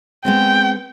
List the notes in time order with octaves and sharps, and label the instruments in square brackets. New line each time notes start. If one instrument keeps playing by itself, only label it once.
[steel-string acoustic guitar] G#3 B3 C4 [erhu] G5